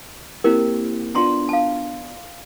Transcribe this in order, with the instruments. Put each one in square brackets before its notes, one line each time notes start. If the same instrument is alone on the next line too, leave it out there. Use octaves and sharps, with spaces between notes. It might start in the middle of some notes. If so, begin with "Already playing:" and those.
[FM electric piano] A#3 C4 G4 [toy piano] E4 A#4
[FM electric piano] B3 D4 F4 [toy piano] A#5 C6
[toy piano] F5 A5